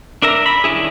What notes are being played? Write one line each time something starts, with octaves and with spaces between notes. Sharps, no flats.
D4 A#4 E5 A#5
B5
D#3 C#4 D4 E4 G#4